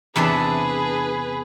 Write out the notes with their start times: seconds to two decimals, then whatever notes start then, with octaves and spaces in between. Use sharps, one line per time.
0.16 E2 C3 D4 G#4 B4 A5 B5